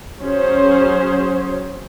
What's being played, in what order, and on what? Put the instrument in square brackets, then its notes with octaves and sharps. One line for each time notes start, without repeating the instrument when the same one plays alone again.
[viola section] F#3 C#4 G#4 C5